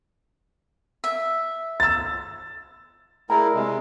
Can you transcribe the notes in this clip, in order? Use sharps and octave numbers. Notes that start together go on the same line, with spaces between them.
E5
E6 A6
A3 E4 G#4 A#4 D5 A#5
C3 G#3